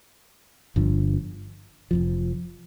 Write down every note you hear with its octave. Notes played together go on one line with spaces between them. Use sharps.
G1 G2 D3 F3
F1 F2 F3